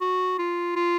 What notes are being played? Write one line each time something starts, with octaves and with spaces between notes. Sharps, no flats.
F#4
F4
F4